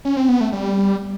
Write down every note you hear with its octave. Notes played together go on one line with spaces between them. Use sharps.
C#4
C4
B3
A3
G3